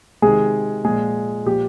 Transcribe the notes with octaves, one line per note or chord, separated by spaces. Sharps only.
C3 D#3 G#3 G#4
A#2 F3 G#3 G#4
A#2 F3 G4